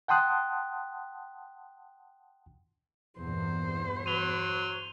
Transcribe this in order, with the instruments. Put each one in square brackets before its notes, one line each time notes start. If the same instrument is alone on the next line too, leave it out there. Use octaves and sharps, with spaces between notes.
[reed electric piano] F#5 G5 A5 C6 D#6 F#6
[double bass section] E2 G2 A#2 [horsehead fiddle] C5
[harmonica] F#3 [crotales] D#7 F7 G7